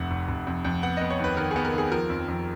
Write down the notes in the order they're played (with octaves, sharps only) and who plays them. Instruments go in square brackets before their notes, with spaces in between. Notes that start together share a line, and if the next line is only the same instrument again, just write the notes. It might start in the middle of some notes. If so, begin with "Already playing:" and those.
Already playing: [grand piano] F1 F2 F#5
F1
F1
F2
F2
B3 F#5
B3 D#5
C#5
D#2
B4
D#3 A#4
B3 G#4
A#4
D#2 G#4
F3 A#4
F2
F2